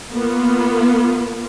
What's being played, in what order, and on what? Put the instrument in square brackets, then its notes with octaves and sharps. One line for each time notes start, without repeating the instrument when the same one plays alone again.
[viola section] A#3 B3 F4